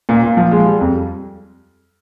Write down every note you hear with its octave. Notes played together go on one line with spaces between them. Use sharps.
A#2
A#2
F3
G#3
G3
F2